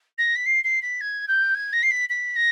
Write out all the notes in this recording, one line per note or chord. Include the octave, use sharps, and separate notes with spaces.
A#6
B6
C7
C7
B6
G#6
G6
G#6
A#6
C7
B6
B6
A#6